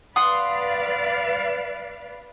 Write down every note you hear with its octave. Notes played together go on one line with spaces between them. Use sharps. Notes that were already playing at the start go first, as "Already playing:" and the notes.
B4 D5 F5 F#5 C6 D#6